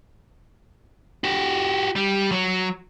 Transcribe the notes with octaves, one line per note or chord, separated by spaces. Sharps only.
F#4 G4
G3
F#3